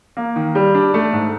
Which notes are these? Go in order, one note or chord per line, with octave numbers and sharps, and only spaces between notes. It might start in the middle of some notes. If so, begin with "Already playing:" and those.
A#3
D#3
G3
D4
A3
G#2